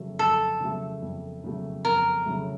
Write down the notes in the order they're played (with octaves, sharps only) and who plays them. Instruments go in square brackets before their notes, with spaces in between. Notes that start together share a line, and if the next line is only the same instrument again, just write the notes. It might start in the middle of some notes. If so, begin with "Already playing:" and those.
Already playing: [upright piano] F2 C#3 F#3 A3
[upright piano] F2 [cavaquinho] A4
[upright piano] C#3 F#3 A3
F2
C#3 F#3 A3
[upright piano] F2 [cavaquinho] A#4
[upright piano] C#3 F#3 A3